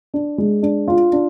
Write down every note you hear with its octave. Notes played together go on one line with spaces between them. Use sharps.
D4
G#3
D4
F4
D4